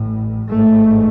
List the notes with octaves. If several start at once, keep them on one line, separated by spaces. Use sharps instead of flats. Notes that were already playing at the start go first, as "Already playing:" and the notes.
Already playing: A1 A2
A1 G#2 A3